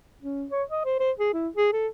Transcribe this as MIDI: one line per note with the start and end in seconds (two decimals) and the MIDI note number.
0.22 0.45 61
0.52 0.63 73
0.70 0.84 75
0.85 0.96 72
1.00 1.11 72
1.19 1.32 68
1.34 1.49 64
1.56 1.70 68
1.73 1.87 69